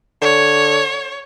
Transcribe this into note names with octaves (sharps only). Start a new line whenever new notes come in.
D3 C#5